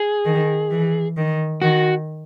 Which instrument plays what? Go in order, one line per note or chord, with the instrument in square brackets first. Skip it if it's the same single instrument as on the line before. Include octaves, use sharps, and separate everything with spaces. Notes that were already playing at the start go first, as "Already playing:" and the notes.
Already playing: [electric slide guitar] G#4
[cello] D#3
E3
D#3
[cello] D#3 [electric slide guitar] F#4